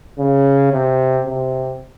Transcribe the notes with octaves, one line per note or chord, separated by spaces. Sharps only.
C#3
C3
C3